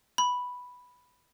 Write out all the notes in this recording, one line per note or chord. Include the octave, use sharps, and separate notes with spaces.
B5